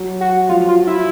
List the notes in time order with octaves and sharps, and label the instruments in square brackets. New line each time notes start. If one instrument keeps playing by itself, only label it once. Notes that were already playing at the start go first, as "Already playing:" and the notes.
Already playing: [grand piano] F#3
[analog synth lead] F#4
[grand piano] F3 [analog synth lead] F4
[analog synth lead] F4
E4